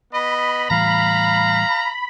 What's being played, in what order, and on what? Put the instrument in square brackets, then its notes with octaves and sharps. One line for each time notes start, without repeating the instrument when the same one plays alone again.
[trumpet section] B3 D#5 [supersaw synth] B5
[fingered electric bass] A2 E3 G3 [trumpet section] F5 [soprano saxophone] A#5